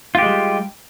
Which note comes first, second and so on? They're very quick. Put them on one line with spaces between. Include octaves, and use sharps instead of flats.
F4 G4 G#3 G3